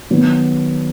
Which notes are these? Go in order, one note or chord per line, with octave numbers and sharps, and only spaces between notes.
D#3 F#3 B3